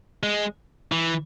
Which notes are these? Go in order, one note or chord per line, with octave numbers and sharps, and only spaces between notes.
G#3
E3